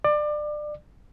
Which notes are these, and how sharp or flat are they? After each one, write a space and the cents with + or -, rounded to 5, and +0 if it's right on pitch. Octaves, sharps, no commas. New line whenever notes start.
D5 +25